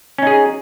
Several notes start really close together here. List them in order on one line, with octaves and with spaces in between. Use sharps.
C#4 D#4 G#4